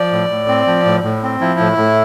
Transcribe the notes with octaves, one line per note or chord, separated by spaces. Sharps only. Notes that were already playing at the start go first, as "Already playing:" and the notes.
Already playing: F3 D5
A2
A2
C4
F3
A2
A2
C4
F3 E4
A2
A2